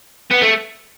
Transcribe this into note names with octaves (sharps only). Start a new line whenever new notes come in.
B3
A3